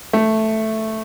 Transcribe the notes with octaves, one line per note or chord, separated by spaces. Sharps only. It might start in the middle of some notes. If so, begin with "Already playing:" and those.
A3